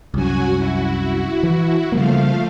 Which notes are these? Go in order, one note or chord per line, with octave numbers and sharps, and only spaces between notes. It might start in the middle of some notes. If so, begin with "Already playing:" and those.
C2 F#2 F#3 F#4 G#5
E4 F#4
E3
C#3 F3 G3 A3 A#3 F5